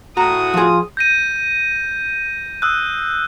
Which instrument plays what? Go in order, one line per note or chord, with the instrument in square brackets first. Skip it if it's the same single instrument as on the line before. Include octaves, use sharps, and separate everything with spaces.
[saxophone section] A2 F#4 [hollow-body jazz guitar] A#5 [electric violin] D#6
[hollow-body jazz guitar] F3 G#4 [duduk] F4
[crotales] G6 A#6 D#7
D#6 E6 F#6